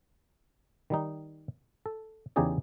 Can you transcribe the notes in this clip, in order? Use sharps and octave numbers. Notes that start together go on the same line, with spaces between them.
D#3 G3 D#4
A4
E2 C#3 D#4 G4 G#4 D5